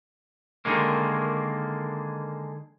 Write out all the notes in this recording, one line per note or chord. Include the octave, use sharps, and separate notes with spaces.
D3 D#3 G#3 A#3